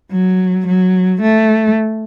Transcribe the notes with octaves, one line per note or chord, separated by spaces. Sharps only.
F#3
F#3
A3